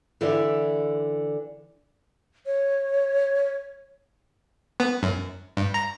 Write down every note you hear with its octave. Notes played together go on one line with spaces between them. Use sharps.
D3 E3 G4 D5 E5
C#5
B3
F#2
G2
A#5